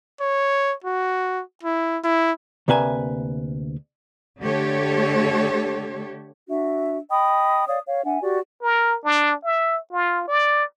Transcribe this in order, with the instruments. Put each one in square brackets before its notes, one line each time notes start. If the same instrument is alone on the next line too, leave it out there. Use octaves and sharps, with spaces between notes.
[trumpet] C#5
F#4
E4
E4
[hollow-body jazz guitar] D2 C3 A#3 B4 E5 G#5
[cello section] D3 A3 G4 A4 C#5
[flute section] D4 F#4 E5
D#5 G5 B5 D#6
C#5 D5 F5 D#6
C#5 F5
D4 E5 F#5 G#5
F#4 G4 D5
[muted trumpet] A#4
D4
E5
F4
D5